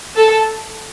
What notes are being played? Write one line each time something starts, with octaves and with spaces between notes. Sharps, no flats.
A4